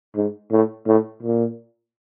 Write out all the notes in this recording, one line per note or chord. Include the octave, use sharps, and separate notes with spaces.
G#2
A2
A2
A#2